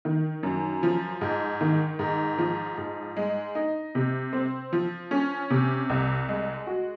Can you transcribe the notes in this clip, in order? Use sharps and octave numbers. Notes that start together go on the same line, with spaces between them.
D#3
F#2
F3
G#2
D#3
G#2
F3
G#2
G#3
D#4
C3
C4
F3
C#4
C3
C2
G#3
F#4